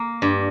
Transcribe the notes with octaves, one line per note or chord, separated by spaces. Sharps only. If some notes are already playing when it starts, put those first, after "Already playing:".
Already playing: A#3
G2